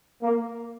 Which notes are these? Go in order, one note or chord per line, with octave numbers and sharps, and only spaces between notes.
A#3